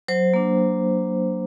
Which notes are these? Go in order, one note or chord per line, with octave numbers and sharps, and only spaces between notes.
F#3 C5
A#3 D4
F#3